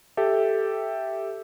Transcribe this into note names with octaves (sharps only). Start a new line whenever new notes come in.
G4 A4 E5